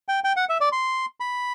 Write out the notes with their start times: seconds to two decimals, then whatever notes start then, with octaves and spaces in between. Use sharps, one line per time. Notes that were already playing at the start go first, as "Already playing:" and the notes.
0.08 G5
0.24 G5
0.36 F#5
0.49 E5
0.61 D5
0.72 C6
1.20 B5